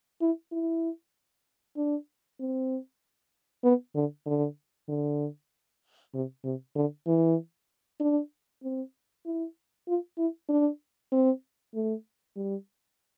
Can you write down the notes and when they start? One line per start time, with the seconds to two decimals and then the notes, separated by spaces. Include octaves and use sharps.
0.21 E4
0.52 E4
1.76 D4
2.40 C4
3.64 B3
3.95 D3
4.26 D3
4.89 D3
6.14 C3
6.44 C3
6.75 D3
7.07 E3
8.00 D4
8.63 C4
9.25 E4
9.88 F4
10.18 E4
10.49 D4
11.12 C4
11.74 A3
12.36 G3